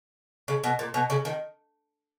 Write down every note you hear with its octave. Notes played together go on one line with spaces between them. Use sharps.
C#3
B2
A#2
B2
C#3
D#3